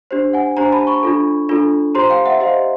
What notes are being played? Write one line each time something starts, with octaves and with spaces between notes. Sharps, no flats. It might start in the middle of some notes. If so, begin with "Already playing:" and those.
D4 G4 C5
F#5 G#5
D4 G4 C5 G#5 A#5
A5 B5
B5 C#6
D4 F4 A4
D4 F4 A4
G4 C5 A#5 C6
F5 G5
E5 F#5
G4 C5 D#5 F5